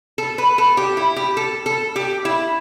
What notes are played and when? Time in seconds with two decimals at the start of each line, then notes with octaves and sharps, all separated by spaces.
0.18 A4
0.38 B4
0.58 A4
0.77 G4
0.97 E4
1.16 G4
1.37 A4
1.66 A4
1.96 G4
2.25 E4